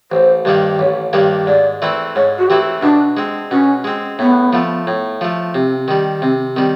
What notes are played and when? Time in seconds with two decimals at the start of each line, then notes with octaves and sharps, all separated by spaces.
0.12 A1 C5
0.45 G2 D#3 G3 A#3
0.79 A1 C#5
1.13 G2 D#3 G3 A#3
1.47 G#2 D5
1.82 E3 A3 C4 E4
2.16 G#2 C#5
2.39 F#4
2.49 E3 A3 C4 E4 G4
2.83 B2 D4
3.17 G#3 C4
3.51 B2 C#4
3.84 G#3 C4
4.19 A2 B3
4.53 F3 A3
4.87 A2
5.21 F3 A3
5.54 C3 C4
5.88 D#3 G3
6.22 C3 C4
6.56 D#3 G3 C4